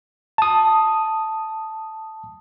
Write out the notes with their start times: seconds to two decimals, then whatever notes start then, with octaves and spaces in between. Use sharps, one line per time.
0.38 A5 D#6